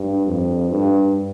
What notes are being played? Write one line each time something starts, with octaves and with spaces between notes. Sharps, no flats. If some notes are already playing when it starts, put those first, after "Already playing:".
Already playing: G2
F2
G2